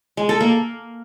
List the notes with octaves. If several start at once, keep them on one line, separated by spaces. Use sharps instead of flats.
G#3
A4
A#3